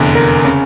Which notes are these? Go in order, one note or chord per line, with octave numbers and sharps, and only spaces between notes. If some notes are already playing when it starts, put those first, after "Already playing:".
Already playing: F1 E2 D3
A#4
C#3